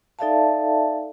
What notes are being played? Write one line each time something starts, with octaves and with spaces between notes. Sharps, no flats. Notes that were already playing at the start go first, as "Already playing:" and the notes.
D#4 A4 D5 E5 F5 A5